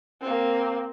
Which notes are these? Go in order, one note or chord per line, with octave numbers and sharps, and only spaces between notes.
A#3 C4